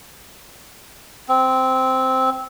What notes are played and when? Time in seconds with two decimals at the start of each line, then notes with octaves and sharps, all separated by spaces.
1.29 C4